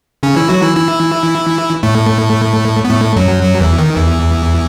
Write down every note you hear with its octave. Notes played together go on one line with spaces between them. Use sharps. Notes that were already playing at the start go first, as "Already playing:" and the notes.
C#3 C#4
E3 E4
F#3 F#4
E3 E4
E3 E4
A2 A3
B3
A2 A3
F#2 F#3
F#2 F#3
E2 E3
D#3
E2 E3